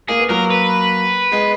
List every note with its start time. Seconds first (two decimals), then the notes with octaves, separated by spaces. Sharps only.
0.08 A#3 G#4
0.19 B3
0.29 F#3 A#3 A#4
0.50 B4
1.32 G#3 B3